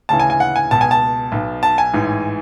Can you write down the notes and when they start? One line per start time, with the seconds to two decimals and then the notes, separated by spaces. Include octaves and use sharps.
0.09 D2 C#3 E3 A5
0.20 G#5
0.30 G#5
0.40 F#5
0.56 G#5
0.71 C#2 B2 A5
0.81 G#5
0.91 A5
1.32 B1 B2
1.63 A5
1.78 G#5
1.94 A1 G#2 E3